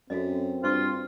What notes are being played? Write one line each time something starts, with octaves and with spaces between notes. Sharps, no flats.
F#2 C4 F#4 A4 D#5
G2 F4 C5 C#6